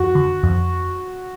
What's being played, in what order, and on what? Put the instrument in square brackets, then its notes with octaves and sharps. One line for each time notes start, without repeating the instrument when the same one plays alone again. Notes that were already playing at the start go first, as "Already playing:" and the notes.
Already playing: [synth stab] F2 [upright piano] F#4
[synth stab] D3
F2